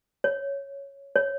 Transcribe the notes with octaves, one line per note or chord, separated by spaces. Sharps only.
C#5
C#5